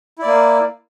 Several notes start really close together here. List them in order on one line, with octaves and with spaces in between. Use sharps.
E4 D5 A#3